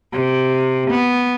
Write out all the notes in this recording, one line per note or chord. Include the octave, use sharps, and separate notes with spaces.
C3
B3